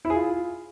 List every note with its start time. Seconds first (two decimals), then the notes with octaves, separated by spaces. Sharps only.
0.05 E4
0.10 G#4
0.15 F4